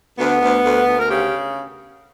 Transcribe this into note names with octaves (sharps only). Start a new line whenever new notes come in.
D2 B3
D2
D2
D2
A#4
C#3 G4